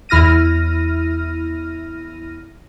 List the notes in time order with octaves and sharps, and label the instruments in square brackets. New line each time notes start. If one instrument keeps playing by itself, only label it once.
[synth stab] E2 E4 F6 A#6 D#7